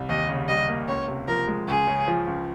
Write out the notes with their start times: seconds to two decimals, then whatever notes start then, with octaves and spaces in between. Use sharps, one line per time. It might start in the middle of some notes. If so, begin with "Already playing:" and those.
Already playing: C2
0.09 D#2 D#5
0.29 C#3
0.48 G3 D#5
0.69 A#3
0.88 C#2 C#5
1.08 C3
1.28 F3 A#4
1.48 G#3
1.68 C#2 G#4
1.87 C#3
2.08 F3
2.27 C#2